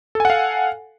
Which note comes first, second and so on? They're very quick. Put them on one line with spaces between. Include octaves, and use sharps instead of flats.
A4 G#5 F#5 F5